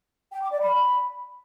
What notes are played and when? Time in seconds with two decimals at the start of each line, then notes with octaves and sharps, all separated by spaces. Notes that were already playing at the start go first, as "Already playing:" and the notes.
0.32 G5
0.42 D6
0.51 D5
0.60 B5